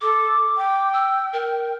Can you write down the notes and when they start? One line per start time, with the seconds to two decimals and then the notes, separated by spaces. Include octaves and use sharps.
0.01 A4 D6
0.57 G5
0.93 E6
1.33 A#4